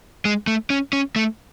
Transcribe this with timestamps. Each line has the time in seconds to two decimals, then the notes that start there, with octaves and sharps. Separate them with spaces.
0.25 G#3
0.47 A3
0.70 C#4
0.93 C#4
1.16 A3